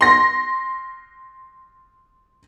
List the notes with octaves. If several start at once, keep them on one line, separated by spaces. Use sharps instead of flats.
C6 A#6